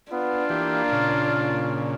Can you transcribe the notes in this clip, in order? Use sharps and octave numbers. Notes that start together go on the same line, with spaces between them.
B3 D4 F4
E3 A#3 G4
A#2 C#3